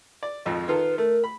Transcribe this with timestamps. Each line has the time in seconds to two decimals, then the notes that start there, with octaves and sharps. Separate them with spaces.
0.23 D5
0.46 G#1 F2 F3
0.68 D#3 F4 A4 B4
0.98 A3 A#4
1.24 B5